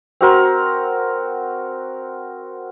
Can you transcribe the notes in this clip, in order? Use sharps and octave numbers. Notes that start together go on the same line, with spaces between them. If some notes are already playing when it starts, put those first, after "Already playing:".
C4 F#4 A#4